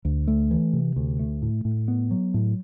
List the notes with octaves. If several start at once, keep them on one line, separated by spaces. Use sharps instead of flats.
D2
A3
E3
C3
D2
A3
A2
A2
B3
F#3
A2